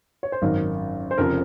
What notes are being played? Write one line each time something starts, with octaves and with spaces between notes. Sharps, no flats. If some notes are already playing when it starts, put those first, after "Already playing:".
C#5
C5
G#1 F#2 D#3 A#4
C5
F1 F2 C#3 F3 A#4